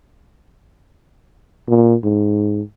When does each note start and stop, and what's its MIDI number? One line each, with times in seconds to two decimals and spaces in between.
1.68 1.95 46
2.04 2.62 44